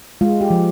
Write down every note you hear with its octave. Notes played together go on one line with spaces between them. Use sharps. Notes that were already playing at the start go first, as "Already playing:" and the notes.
G#3 F4
G4
F3